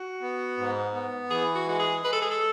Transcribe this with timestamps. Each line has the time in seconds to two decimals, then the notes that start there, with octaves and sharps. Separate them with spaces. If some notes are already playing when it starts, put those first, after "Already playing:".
Already playing: F#4
0.21 B3
0.57 G#2
0.94 B3
1.30 E3 G#4
1.55 F#4
1.67 G#3 F#4
1.79 G#4
2.04 G#3 B4
2.13 A4
2.22 G#4
2.31 A4